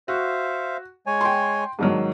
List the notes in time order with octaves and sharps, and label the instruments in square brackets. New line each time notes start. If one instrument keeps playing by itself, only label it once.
[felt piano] F#4 [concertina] C5 E5 F5
[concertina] G#3 C#5 G#5
[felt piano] G5 C6
[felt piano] G#2 D#3 F#3 [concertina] D4